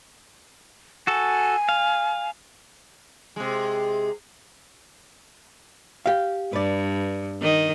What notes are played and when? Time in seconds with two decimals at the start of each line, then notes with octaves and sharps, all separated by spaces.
1.07 F#4 A4 G#5
1.69 F5
3.36 C3 G#3
6.06 G4 F5
6.53 G2 B4 D5
7.42 D#3 D#5